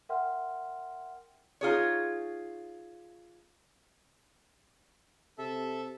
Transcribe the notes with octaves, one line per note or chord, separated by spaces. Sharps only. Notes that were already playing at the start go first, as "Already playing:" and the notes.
A#4 E5 F#5 G5 C6 F6
D#4 F4 G#4 C#5
C3 A4 E5